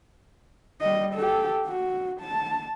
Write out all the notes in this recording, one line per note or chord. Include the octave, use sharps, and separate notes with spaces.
G3 D#5
G4 A4
F#4
A5